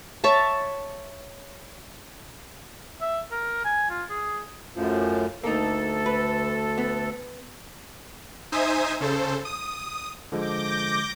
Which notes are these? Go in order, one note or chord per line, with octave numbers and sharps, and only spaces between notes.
C#5 E5 A5
E5
A#4
G#5
F4
G#4
F#2 A2 F3
D2 A#3 D#4 A4
B4
B3
D#4 C5 E5 G#5 D#6
C#3 A4 C5
D#6
D3 F3 G#3 D6 G6 A#6